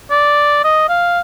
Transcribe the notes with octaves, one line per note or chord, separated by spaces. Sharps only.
D5
D#5
F5